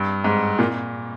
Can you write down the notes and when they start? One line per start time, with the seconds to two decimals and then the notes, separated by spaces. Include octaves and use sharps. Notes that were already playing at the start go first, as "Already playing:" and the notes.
Already playing: G2
0.24 G#2
0.59 A#2